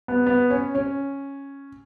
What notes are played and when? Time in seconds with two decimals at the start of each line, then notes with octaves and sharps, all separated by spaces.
0.08 B3
0.26 B3
0.50 C#4
0.75 C#4